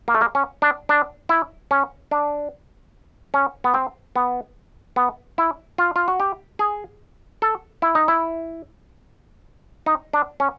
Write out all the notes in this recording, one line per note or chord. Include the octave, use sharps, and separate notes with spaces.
A#3
A3
A#3
C#4
D4
D4
E4
C#4
D4
C#4
B3
C4
B3
B3
E4
F4
F4
F#4
G4
G#4
A4
E4
D#4
E4
D#4
D4
C#4